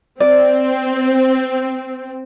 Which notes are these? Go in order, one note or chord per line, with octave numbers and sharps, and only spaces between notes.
C4 D5